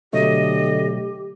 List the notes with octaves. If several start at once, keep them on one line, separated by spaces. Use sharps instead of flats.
B2 D3 F#3 A3 G4 D#5